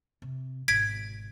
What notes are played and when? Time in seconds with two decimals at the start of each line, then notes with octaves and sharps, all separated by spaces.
0.22 C3
0.68 G#1 B2 G#6 B6 D7